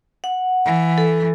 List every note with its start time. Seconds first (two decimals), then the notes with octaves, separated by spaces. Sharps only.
0.24 F#5
0.65 E3
0.98 A4